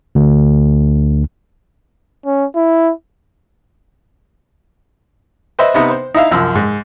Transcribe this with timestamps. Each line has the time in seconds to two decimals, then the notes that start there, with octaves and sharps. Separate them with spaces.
0.15 D2
2.26 C#4
2.56 E4
5.59 B4 C5 D#5 E5
5.74 C3 B3 D#4 E5
5.90 C5
6.14 D#4 E4 E5 F5
6.31 C2 F#2 F3 E6
6.55 G#2